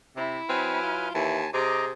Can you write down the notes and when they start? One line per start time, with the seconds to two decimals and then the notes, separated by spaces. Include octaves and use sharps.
0.16 C3 E4
0.49 F#3 C4 B4 G#5 F6
0.83 F4
1.15 D#2 E3 G#5 A5
1.54 C3 G#4 D#5 A#5 D6